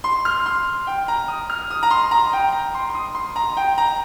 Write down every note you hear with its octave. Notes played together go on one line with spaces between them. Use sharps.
C6
F6
C6
G5
A#5
D#6
F6
D#6
A#5
C6
A#5
G5
A#5
C6
C6
D#6
C6
A#5
G5
A#5